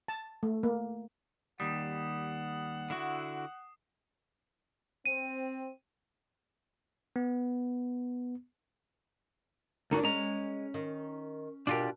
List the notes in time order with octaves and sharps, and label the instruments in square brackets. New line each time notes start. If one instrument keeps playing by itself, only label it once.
[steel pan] A5
A3
A#3
[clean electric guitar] D#2 G3 [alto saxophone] F#5 [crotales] D#6 C7
[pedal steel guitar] D3 E4 F#4
[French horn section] C4 [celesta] D#7
[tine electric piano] B3
[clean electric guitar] D2 D#4 F#4 [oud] E3 D4 A#4
[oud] G#3 [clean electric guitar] C#4 A#5
[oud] D#3
[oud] B2 A#4 [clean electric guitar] D4 F4 G4